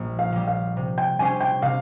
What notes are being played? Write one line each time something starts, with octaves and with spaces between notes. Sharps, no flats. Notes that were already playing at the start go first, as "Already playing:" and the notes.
Already playing: A#1 A#2 G3
F5
A#2 G3
F5
C3
G5
G3 C#4 G4 C5 G#5
G5
C3 F5